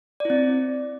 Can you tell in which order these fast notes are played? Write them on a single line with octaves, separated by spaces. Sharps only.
D5 E4 C4